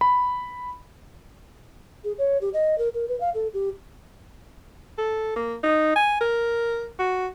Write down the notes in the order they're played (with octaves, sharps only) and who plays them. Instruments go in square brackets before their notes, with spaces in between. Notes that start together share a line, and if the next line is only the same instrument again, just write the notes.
[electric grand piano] B5
[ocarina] G#4
C#5
G4
D#5
A#4
A#4
B4
F5
A4
G4
[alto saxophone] A4
A#3
D#4
G#5
A#4
F#4